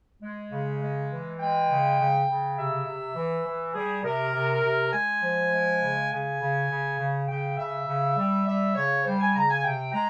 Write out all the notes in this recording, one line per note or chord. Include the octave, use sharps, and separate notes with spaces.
G#3
C#3
G#3
E3
G#3 G5
C#3
C#3
C#3
C3 E5
C3
E3
E3
G3 G#4
C3 A#4
C3
C3
G#3 G#5
F3
G#3
C#3
C#3 G#5
C#3
C#3
C#3
C#3 G5
C#3 E5
C#3
G3
G3 E5
C#3 C#5
G3 C5
G#5
C#3 A#5
G#5
C3 G5
G#3 A#5